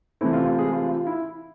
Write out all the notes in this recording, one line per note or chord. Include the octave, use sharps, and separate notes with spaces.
C3 E3 A3 C4 E4
F4
F4
G#3 G#4
F4
F4
E4